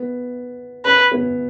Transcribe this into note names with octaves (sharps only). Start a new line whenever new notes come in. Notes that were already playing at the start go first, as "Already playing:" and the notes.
Already playing: B3
C#4 B4
B3